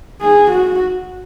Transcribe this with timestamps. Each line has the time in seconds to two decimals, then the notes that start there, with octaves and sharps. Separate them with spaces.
0.21 G#4
0.50 F#4